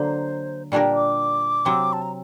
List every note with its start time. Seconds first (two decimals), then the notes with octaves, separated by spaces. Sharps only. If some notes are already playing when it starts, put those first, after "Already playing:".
Already playing: D3 F#3 A#3 C5
0.72 A#2 G3 D4 G4 A#4 G5
0.95 D6
1.65 C3 F#3 C4
1.93 A5
2.02 A#5